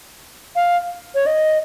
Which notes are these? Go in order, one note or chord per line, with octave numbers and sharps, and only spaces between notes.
F5
C#5
D#5